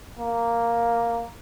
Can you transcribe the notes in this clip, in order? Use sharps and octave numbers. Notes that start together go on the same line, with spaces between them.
A#3